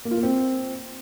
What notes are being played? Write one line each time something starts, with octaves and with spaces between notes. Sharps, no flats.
A#3
F4
A#3
C4